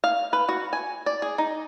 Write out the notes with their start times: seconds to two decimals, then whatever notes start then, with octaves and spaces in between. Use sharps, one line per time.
0.04 F5
0.33 B4
0.49 F#4
0.73 G#5
1.06 D5
1.22 G#4
1.38 D#4